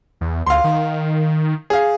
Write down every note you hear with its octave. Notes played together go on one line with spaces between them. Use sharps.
E2
D2 F5 C6
D#3
G#4 F5